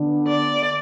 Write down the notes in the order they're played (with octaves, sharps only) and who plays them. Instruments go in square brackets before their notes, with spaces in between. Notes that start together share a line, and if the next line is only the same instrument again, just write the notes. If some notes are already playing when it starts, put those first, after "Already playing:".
Already playing: [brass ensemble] D3 B3 D4
[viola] D5